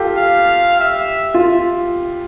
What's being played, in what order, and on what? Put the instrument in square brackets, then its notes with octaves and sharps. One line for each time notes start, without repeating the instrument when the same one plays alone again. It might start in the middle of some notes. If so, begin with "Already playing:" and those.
Already playing: [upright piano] F4 G4 A4
[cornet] F5
E5
[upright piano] F4